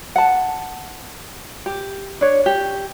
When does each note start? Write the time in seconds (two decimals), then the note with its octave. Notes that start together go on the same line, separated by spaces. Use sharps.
0.16 F#5 A5
1.66 G4
2.21 D4 C#5
2.46 G4